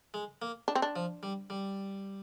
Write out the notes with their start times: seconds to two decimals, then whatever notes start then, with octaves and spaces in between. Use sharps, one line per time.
0.14 G#3
0.42 A#3
0.68 D4
0.75 C4
0.82 D4
0.96 F3
1.23 G3
1.50 G3